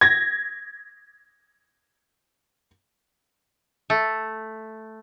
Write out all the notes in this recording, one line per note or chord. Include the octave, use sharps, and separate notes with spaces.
G#6 A#6
A3